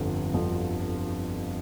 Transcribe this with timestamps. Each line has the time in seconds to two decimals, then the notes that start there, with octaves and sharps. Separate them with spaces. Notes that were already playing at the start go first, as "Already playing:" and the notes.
Already playing: G1 F2 D3 F3
0.33 G1 F2 D3 F3